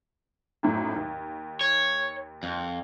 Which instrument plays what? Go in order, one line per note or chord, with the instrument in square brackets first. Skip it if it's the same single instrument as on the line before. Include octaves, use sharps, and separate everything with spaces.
[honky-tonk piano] G#1 F#2 A2
D#2
[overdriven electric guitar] C#5
F2